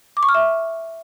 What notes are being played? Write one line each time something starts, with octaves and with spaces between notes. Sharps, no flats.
D6
C#6
F6
E5